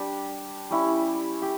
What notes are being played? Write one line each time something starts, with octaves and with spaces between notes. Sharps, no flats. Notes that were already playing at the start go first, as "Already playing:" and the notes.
Already playing: G3 D4 G4
G3 C#4 E4
G4